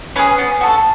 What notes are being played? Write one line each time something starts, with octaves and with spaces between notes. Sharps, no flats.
C#4 G#4 B4
B3
F#4 A4